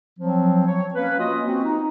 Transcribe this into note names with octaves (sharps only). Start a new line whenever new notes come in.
F3 F#3 C4
C#5
A#3 C#4 B4
A#3 C#4 F4 F#4 D#5
C4 F#4
D#4